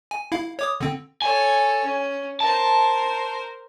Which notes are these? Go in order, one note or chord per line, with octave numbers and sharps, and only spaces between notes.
G#5
E4 F5
C#5 D6 D#6
D3 C4
A4 C#5 G#5
C#4
A#4 C5 A5